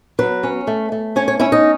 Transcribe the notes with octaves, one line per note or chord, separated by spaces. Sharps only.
F#3 B4
C#4
A3
A3
C#4 C#5
C#5
C#4 E4
D#4